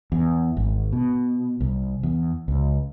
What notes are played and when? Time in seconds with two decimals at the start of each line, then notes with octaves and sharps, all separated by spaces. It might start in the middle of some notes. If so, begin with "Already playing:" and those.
0.12 E2
0.57 G#1
0.93 B2
1.60 C2
2.03 E2
2.48 C#2